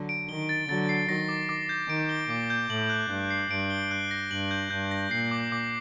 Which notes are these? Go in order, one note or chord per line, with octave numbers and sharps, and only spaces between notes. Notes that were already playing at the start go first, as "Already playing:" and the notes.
Already playing: D3 F#3
D7
D#3 G7
A6
D3 F#3 A6
C7
D#3 A#6
D6
D6
G6
D#3 D7
G7
A#2 D6
G6
A2 F#7
F#6
G2 F#6
C7
G2 D7
G7
F#6
A#6
G2 F#7
G6
G2 G6
A#6
A#2 C7
D6
D6